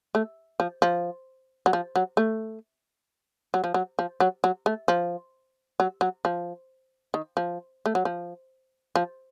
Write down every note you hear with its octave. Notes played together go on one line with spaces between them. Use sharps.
A3
F3
F3
F#3
F3
F#3
A3
F#3
F3
F#3
F3
F#3
F#3
A3
F3
F#3
F#3
F3
D#3
F3
A3
F#3
F3
F3